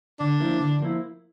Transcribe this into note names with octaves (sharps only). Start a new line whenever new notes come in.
D3 D4
F3 A#3 E4
D3
F3 A#3 E4